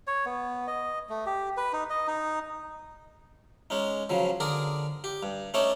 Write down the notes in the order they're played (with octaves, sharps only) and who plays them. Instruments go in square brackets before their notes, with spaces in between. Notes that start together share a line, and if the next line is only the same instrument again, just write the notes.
[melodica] C#5
B3
D#5
A3
G4
B4
D#4
D#5
D#4
[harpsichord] G#3 C#4 D#4
C#3 F3 F#3
D3 G#4 A#4 D5
G4
G2
A3 C#4 D#4 C#5 D5 A5